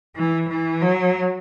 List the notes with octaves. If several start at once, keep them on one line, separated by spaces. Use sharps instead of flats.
E3
E3
F#3